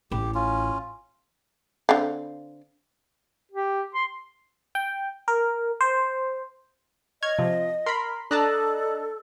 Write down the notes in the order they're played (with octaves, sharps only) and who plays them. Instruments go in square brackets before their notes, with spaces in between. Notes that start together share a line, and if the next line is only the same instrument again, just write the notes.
[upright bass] A1 [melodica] G4
[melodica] C#4 F4
[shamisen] D3 C4 F5
[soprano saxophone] G4
C6
[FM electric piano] G5
A#4
C5
[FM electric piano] C#5 F6 [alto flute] D#5 [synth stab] G#6
[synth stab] C3 [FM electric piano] F3
[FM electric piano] A#4 [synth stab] B5 C6
[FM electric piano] D4 D#5 [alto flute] A4 [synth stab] A5 A#5 F#6